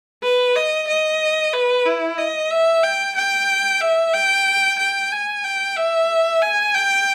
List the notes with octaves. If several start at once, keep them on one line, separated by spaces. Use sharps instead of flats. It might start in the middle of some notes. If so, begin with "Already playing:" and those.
B4
D#5
D#5
B4
E4
D#5
E5
G5
G5
E5
G5
G5
G#5
G5
E5
G#5
G5